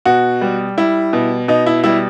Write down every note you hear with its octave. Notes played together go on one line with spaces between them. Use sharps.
B2 F#4
G3
G3 E4
B2
B2 D#4
E4
G3 E4